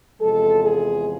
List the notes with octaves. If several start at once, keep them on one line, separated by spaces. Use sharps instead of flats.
E2 C3 F3 G#3 A4
G#4